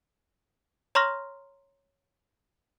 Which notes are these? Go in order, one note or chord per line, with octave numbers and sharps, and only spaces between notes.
C#5 A#5 C6 C#6 F6 A#6